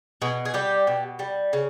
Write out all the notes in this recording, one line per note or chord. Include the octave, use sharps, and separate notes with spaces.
B2 G#4
G#4
G3 G4
B2
G3
C#3